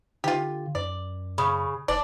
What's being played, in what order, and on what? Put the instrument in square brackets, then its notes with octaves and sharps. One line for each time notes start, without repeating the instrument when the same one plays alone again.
[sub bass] D3 [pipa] F4 G4
[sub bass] F#2 [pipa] D5
[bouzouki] C#3 [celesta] B5 C#6 D#6
[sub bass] F1 [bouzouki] D4 [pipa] D5 [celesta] D6